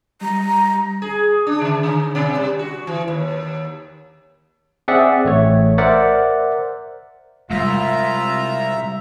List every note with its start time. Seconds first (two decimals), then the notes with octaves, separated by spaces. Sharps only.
0.22 G3 A#5
1.02 G#4
1.47 D4
1.61 C#3
1.83 D3
2.15 B2
2.35 G3
2.59 F#4
2.87 E3
3.08 D#2
4.88 C4 G#4 D5 E5 F#5
5.25 A1 A3 C#5
5.78 A#4 C5 D5 E5 F#5
7.50 C2 F#2 G3 G#3 F4 E5 A#5